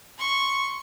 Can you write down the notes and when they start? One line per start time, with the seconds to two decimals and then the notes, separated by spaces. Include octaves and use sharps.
0.18 C6 C#6